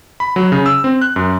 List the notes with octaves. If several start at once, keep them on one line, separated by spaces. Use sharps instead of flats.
B5
F#3
C#3
E6
C4
F#6
F#2